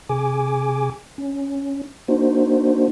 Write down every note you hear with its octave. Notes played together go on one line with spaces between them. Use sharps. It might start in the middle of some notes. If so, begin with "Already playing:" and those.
C3 G#4 G#5 D6
C#4
A#3 D4 D#4 F#4 C5